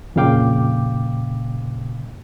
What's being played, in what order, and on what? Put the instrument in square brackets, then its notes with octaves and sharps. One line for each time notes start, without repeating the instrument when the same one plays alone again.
[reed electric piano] F2 A#2 C#3 F5 G5 D6